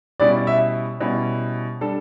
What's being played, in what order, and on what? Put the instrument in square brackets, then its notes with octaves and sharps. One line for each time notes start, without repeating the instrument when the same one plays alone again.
[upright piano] B2 G3 C#4 E4 [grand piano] D5
[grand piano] E5
[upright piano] B2 G3 C#4 E4
G3 D4 A4